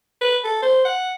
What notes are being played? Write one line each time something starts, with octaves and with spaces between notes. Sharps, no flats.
B4
A4
C5
F#5